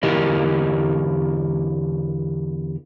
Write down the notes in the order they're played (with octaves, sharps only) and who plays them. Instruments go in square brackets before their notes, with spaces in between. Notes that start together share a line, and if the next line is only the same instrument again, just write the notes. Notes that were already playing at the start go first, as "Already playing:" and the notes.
[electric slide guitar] E2 D3 E4 G4 A#4 D#5